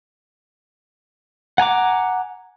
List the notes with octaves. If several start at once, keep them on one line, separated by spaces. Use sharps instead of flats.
F#5 G#5 A#5 D6